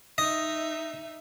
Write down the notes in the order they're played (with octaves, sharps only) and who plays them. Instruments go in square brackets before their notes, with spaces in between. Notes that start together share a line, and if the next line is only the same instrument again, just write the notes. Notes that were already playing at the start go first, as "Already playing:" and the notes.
[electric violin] D#4 E5 [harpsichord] D#5